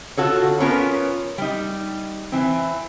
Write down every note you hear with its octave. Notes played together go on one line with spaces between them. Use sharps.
F4 F#4 A4 C#5
D3
B3 C#4 F4 A#4 B4 C#5
G3 D#4
E3 C4